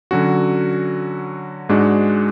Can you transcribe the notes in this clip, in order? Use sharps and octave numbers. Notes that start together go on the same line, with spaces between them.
D3 F#3 C#4 F#4
G#2 G#3 D4 F#4